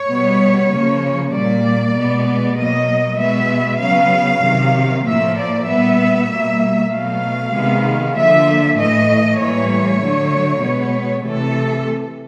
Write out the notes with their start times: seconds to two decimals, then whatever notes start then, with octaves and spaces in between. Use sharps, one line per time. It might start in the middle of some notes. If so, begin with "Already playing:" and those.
Already playing: C#5
0.09 B2 G3 B3
0.70 C#3 F3 A#3
1.32 A#2 G3 A#3 D5
1.95 B2 G#3 B3
2.57 B2 F#3 A#3 D#5
3.19 B2 G#3 B3 E5
3.81 C#3 F#3 B3 F5
4.43 C3 D#3 F#3
5.05 A2 F3 A#3 E5
5.37 D5
5.67 A#2 G3 B3 E5
6.29 B2 G3 A#3
6.91 B2 F#3 A3 F5
7.54 C3 D#3 G#3 B3
8.16 D3 F3 A#3 E5
8.78 A2 E3 A3 D#5
9.40 A2 E3 G3 A#3 C#5
10.01 D3 F#3 A3
10.64 B2 G#3 B3
11.26 C3 E3 A3 A4